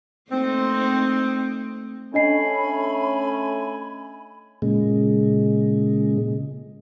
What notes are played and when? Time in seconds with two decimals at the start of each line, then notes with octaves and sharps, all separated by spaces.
0.31 A3 A#3 C4 D#4
2.14 A3 C#4 D4 D#5 G#5 B5 C7
4.62 A#2 C#3 G#3